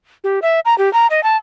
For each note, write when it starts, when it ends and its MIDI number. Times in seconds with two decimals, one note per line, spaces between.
0.24 0.39 67
0.42 0.60 76
0.65 0.77 82
0.78 0.92 67
0.93 1.07 82
1.10 1.23 75
1.23 1.37 81